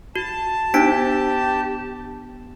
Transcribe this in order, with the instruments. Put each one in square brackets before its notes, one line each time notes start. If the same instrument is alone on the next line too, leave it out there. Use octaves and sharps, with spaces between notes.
[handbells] F#4 [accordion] A5
[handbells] B3 B6 D7 [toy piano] D4 C5 [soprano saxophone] G4